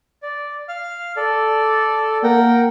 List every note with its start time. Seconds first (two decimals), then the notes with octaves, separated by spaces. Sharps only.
0.23 D5
0.69 F5 F6
1.16 A4 D5
2.23 A#3 A#4 F#5 G5